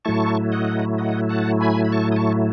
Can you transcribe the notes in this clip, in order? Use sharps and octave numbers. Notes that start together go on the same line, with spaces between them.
A2 F#3 A3 E4 A5 C#6
D#5 F#5
D#5 F#5
F#5 A5
G#5 B5
B5
A5 C#6
D#6
A5 C#6